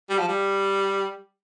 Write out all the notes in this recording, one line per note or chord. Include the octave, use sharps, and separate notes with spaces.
G3
F3
G3